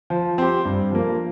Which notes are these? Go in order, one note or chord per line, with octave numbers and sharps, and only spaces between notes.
F3
C4 G4
G2
F3 A#3